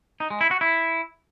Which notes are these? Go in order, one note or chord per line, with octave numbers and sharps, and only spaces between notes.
D#4
G#3
E4
F#4
E4